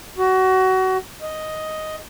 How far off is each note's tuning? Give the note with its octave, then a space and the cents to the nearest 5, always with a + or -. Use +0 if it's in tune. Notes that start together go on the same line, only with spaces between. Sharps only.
F#4 +25
D#5 +5